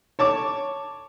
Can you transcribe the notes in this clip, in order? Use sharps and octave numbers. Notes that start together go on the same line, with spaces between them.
C#5 A5 D6